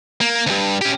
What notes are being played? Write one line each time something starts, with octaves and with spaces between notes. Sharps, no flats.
A#3
D2 G2
C#4 G4